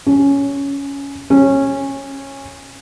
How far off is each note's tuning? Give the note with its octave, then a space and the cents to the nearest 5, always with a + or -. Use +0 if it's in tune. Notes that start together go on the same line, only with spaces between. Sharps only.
C#4 +10
C#4 -15